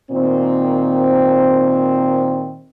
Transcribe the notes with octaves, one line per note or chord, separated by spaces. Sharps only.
A#2 D#3 C4